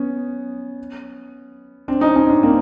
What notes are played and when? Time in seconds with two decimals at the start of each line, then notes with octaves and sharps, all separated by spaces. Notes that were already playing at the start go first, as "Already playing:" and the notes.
Already playing: B3 C#4
1.88 C4 D4
2.01 C#4 D#4
2.16 C#4 D#4
2.29 C4 D4
2.43 A#3 C4